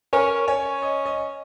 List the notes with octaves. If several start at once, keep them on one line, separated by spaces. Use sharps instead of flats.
C#4 A#4
C#4 C#5
D#5
D#5